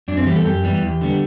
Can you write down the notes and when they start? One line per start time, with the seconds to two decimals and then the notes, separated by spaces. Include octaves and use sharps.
0.08 F#2 D4
0.17 C4
0.26 E3 G3 B3 G4
0.36 A4
0.45 F#2 G4
0.64 E3 G3 B3
0.82 E2
1.01 D3 G3 B3